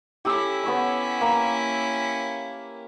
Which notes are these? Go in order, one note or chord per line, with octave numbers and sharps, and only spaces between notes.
C#4 E4 G4 A4 E6
B3 C#5 E6
A#3